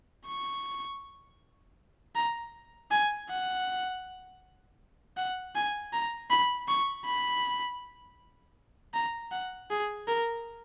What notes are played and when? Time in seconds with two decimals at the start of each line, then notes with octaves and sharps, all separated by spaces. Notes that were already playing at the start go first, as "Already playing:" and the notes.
0.27 C#6
2.15 A#5
2.91 G#5
3.29 F#5
5.17 F#5
5.55 G#5
5.93 A#5
6.30 B5
6.68 C#6
7.06 B5
8.95 A#5
9.32 F#5
9.70 G#4
10.08 A#4